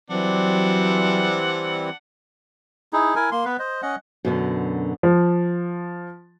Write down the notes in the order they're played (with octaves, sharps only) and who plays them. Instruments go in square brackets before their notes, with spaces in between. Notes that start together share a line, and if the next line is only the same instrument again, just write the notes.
[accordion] E3 G3 C4 [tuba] F#3 [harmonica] D4 F#5
[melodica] D#4 E4 G#4
E4 A#4 G#5
A#3 C6
B3 B4
C5 D#5
C#4 D#5 F#5
[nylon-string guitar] F#2 B2 D3
[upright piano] F3